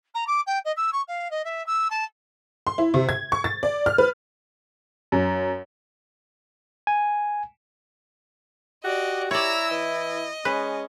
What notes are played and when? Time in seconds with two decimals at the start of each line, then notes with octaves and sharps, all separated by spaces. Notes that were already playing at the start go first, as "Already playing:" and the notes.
0.14 A#5
0.27 D6
0.46 G5
0.65 D#5
0.76 E6
0.93 C#6
1.07 F5
1.30 D#5
1.44 E5
1.66 E6
1.90 A5
2.67 C6
2.78 E4
2.94 C3
3.09 G#6
3.32 C#6
3.44 A6
3.63 D5
3.86 F6
3.98 B4
5.12 F#2
6.87 G#5
8.84 F#4 G4 D5 D#5
9.31 E4 C#5 D5 A#5 E6
9.71 E3 D#5
10.45 G#3 C#4 B4